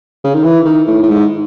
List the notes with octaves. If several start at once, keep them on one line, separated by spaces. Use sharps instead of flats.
C#3
D#3
E3
D#3
A2
A2
G#2